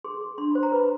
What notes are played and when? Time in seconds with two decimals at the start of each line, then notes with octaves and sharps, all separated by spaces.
0.04 G#4 C6
0.21 G#4
0.38 D4 C6
0.51 C5 B5
0.63 A#5
0.72 B4 B5